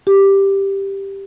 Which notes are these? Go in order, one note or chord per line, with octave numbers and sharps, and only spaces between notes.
G4